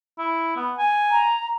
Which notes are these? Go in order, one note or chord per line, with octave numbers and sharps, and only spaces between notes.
E4
B3
G#5
A#5